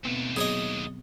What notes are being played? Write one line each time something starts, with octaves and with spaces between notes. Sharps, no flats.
D#2 B2 A3 B3 C4
F#3 B3 G#4 C#5 D#5